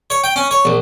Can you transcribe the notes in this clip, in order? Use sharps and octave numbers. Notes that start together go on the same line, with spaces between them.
C#5
G5
C#4
C#5
A#1